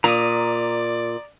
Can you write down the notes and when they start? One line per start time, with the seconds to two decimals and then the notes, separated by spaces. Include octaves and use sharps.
0.04 A#2 D5 A#5 D#6